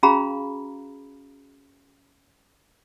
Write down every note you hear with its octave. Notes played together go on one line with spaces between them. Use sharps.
C#4 F#4 G#4 F5 A#5 B5